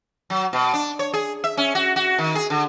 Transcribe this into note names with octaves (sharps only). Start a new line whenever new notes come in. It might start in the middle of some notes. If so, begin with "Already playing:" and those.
F#3
B2
D4
C#5
G#4
E5
C#4
F#4
F#4
D#3
G#4
D3